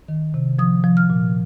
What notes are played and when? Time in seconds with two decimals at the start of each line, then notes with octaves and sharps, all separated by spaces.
0.08 D#3
0.34 C3
0.59 F3 D#6
0.84 F3
0.97 F6
1.10 A#2